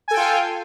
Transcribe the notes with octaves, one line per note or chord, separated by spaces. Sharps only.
F4 A4 G5 G#5